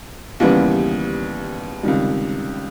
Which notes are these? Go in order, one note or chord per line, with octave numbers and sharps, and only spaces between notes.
D#2 C#3 E3 G3 B3
C#2 C3 D#3 G3